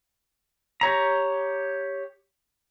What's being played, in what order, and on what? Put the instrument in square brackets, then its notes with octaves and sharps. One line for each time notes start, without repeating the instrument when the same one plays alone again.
[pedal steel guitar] G4 C#5 A#5